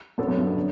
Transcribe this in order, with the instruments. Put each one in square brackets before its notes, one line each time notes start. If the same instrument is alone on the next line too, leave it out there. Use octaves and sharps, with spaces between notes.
[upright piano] F#2 [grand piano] F#3 B3 D4 A4 C#5
[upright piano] F#2
G2
[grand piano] D3